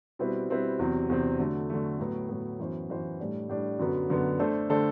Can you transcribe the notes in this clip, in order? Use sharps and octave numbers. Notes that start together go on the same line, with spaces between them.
B2 G3 C4 E4 B4
B2 G3 C4 E4 B4
E2 C3 F#3 C4
E2 C3 F#3 C4
D3 F#3 A3
D3 F#3 A3
A2 F#3 B3
A2 F#3 B3
F#2 E3 B3 F#4 C5
F#2 E3 B3 F#4 C5
A2 G3 D4
A2 G3 D4
F#2 D3 F#3 B3
F#2 D3 F#3 B3
D3 A3 D4 A4 C5
D3 A3 D4 A4 C5